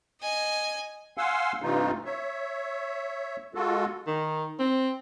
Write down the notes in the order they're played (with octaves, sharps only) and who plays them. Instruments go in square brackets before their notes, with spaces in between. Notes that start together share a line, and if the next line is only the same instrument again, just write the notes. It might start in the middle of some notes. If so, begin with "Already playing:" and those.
[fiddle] D#5 G#5
[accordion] F5 F#5 G#5 C6 E6
G2 C3 E3 A3 D#4 F4
C#5 E5
G#3 F4 F#4 A4
[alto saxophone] D#3
C4